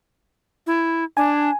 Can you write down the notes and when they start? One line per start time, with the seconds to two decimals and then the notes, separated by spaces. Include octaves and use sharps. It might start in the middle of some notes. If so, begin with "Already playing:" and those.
0.67 E4
1.17 D4 G#5